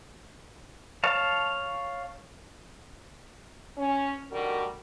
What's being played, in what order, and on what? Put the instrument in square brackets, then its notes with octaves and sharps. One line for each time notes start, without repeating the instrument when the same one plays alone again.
[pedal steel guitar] C#5 F5 A5
[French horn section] C#4
D3 D#3 G3 A3 F#4 A#4